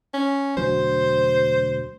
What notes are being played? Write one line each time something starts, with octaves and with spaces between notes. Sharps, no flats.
C#4
E1 D2 F#3 C5